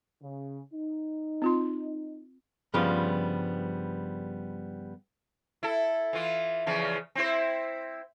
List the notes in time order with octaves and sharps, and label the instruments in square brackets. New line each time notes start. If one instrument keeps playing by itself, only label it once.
[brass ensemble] C#3
D#4
[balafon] C4 F4 C6
[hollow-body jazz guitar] G2 C#3 F3 G3 B3 F4
[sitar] E4 A4
E3 F4
E2 C#3 F3
C4 E4 C5